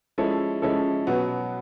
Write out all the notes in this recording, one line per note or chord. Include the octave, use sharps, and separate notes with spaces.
F3 G#3 C#4 E4 A4
F3 G#3 C#4 E4 A4
B2 F#3 B3